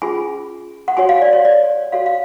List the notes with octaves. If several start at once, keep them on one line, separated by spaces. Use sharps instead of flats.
C#4 F4 G#4 G#5
F#5
F#4 C#5 G#5
F5
D5
C#5
D5
F#4 A4 C#5 F5
F5